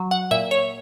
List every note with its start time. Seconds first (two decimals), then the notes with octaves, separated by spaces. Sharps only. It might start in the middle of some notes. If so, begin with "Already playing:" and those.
Already playing: F#3
0.11 F#5
0.31 A#2 E5
0.51 C#5